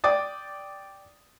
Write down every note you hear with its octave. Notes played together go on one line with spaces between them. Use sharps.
D5 G5 D6 D#6 A6